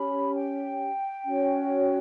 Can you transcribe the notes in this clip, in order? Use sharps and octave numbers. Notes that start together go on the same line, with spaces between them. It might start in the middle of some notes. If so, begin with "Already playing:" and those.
Already playing: C#4 G4 C#5 B5
G5
C#4 F#4 C#5